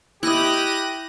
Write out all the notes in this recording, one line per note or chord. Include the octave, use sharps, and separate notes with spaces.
E4 G4 D#5 F#6 A#6 D#7